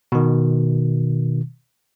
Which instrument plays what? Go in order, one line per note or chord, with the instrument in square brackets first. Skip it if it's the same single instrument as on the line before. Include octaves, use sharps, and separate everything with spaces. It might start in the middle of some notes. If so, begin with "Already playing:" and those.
[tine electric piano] B2 D#3